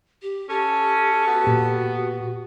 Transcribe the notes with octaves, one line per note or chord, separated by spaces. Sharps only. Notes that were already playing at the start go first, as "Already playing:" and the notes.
G4
C#4 G4 A4
B3 F#4
A#2 G4